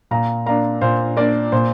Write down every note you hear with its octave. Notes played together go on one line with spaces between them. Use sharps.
A#2 F5 A#5
A#3 D4 F5 A#5
A#2 C5 F5
A#3 D4 A#4 D5
A#2 C5